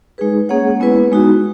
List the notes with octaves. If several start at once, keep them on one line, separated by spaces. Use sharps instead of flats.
G#3 D#4 G#4 B4
A#3 C#4 G#4 C#5 F#5
G#3 B3 E4 B4
G#3 D#4 F#4